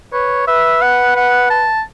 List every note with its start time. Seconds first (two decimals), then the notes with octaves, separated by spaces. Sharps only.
0.13 B4 C#5
0.48 B4 E5
0.82 F#5
1.17 F#5
1.50 A5